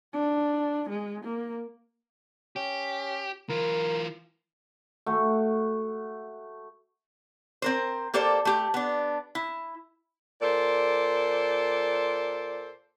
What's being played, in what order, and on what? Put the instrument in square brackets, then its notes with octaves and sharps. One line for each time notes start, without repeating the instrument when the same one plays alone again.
[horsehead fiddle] D4
G#3
A#3
[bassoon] C#4 [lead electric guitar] G4
[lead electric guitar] E3 F4 [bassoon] A#4
[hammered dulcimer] A3 F#4
[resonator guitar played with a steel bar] C4 A#4 C5
A#3 G4 A4 C5 D5
A3 G4
B3 D4
E4
[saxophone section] A#2 A4 C5 D5